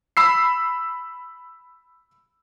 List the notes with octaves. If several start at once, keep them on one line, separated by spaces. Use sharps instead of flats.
B5 E6 C7